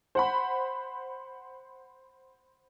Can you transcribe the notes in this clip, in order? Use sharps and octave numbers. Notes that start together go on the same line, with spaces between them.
C5 F#5 B5